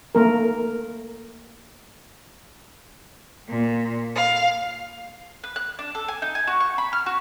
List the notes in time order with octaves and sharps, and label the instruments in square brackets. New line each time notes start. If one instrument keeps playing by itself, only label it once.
[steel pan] A3 A#3 A#4
[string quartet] A#2
F5
[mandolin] B4
F#6
D4
A4
G#5
D#4
G#5
F#4
C#6
B5
F6
F#4